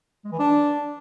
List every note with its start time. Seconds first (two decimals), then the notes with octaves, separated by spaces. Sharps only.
0.25 G#3
0.32 E3
0.39 D4